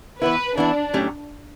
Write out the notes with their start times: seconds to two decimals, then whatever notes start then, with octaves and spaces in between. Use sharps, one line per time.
0.21 E3 B3 E4 B4
0.57 E3 B3 D4 E4
0.94 A2 F#3 A3 C#4 G4